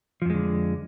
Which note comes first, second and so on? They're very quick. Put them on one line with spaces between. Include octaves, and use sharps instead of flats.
F3 F2 G#3 D3